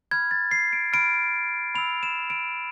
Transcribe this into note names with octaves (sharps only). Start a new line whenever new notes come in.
B5 F6 G#6
A6
C7
D7
B5 F6 D7
B5 E6 F7
E7
D7